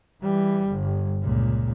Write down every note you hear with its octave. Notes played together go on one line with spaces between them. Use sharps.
E3 G3
G1
C#2 A#2